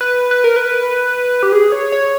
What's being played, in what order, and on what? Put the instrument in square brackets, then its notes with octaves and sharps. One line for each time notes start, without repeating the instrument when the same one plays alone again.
[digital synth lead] B4
B4
A#4
B4
G4
G#4
C#5
C#5